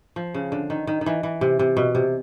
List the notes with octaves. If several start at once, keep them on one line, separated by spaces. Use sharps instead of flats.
F3
C#3
D3
D#3
D#3
D#3
E3
E3
C3
C3
B2
C3